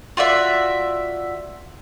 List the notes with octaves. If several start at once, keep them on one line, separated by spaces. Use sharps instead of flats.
F4 F#4 D5 E5